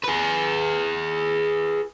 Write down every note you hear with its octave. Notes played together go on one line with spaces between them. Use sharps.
G#4 B4